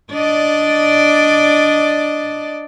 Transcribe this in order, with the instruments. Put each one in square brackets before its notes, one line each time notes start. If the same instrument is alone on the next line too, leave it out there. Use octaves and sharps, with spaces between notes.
[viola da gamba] D4 D5 D#5